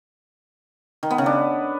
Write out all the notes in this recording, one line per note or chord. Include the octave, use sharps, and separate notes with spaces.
D#3
B3
C#3
D4